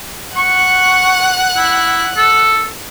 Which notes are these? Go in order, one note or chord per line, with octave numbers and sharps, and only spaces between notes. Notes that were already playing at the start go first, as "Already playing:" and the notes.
F#5 C#6 F#6
E4
A4